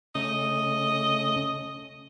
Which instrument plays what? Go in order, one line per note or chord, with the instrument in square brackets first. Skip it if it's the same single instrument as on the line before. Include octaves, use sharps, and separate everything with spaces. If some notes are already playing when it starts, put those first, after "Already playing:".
[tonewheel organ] C#3 A3 C#4 [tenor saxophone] D#5